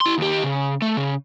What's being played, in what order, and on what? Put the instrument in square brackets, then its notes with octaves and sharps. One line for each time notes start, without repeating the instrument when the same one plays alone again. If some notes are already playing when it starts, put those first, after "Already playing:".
[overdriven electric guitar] E4 C6
D#2 G4
C#3
A3
C#3